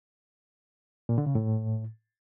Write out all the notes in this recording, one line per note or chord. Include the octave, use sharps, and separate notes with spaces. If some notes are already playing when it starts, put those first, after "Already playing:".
A#2
D3
C#3
A2